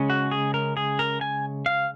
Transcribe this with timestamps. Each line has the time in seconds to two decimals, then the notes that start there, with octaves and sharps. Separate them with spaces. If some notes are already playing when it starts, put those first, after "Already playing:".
Already playing: C#3 G#3 C#4
0.10 F#4
0.31 G#4
0.54 A#4
0.77 G#4
0.99 A#4
1.21 G#5
1.66 F5